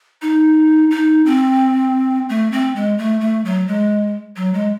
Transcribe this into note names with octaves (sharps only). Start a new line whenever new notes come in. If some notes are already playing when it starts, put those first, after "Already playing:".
D#4
D#4
C4
A3
C4
G#3
A3
A3
F#3
G#3
F#3
G#3